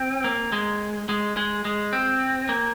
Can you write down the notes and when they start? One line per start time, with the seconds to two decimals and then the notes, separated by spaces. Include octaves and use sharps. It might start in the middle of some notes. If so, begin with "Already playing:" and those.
Already playing: C4
0.24 A#3
0.52 G#3
1.09 G#3
1.37 G#3
1.65 G#3
1.93 C4
2.49 A#3